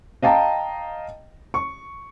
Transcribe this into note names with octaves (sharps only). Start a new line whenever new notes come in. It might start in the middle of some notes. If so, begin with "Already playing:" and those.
D#5 F5 G5 A5 A#5
C#6